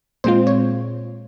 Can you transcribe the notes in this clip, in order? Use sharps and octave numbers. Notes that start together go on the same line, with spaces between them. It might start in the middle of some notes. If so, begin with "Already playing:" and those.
A#2 G#3 C4 F4 C5
C#5